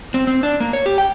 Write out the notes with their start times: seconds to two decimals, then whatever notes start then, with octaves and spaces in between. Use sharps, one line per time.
0.14 C4
0.27 C4
0.43 D4
0.60 A#3
0.73 C#5
0.86 G4
0.98 G5